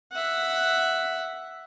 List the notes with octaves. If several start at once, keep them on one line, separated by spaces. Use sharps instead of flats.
E5 F#5